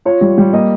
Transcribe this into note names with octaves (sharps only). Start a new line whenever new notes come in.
F4 C#5
G3
G3
A#3 D#5